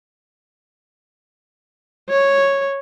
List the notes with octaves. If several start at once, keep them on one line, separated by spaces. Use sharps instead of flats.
C#5